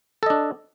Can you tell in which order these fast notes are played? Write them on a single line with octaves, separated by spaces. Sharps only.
A4 D#5 D4